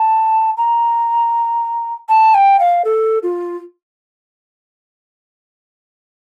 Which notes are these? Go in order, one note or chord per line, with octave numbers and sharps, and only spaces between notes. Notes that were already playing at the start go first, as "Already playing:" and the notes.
Already playing: A5
A#5
A5
G5
F5
A4
F4